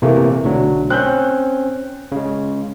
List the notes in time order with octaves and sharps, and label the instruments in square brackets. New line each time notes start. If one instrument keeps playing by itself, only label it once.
[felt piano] C3 [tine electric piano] E3 A3 A#3
[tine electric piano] B1 F#3 [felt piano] D3 A3
[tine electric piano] C4 C#4 [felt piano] F#6 G6
[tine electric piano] C#3 G#3